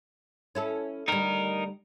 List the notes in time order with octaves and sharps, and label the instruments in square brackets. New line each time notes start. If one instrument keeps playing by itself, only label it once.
[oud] C#4 E4 A4
[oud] D2 G3 [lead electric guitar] D#4 A#4